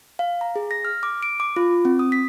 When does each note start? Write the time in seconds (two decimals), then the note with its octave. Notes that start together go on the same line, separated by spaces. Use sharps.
0.19 F5
0.41 A#5
0.56 G#4
0.71 A#6
0.85 F6
1.03 D6
1.23 D7
1.40 D6
1.56 F4
1.85 C4
1.99 D#6
2.12 B6